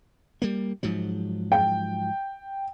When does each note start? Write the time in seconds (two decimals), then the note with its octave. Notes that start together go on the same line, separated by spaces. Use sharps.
0.42 G3 A#3
0.83 G#2 F3 F#3
1.52 G5